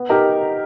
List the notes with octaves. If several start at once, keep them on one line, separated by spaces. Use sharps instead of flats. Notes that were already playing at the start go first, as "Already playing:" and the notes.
Already playing: B3
D#4 G4 A#4